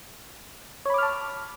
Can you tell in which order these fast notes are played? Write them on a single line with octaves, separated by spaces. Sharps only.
C#5 B5 D6 F6 A5